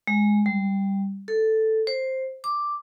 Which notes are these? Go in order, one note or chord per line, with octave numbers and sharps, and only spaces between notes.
G#3
G3
A4
C5
D6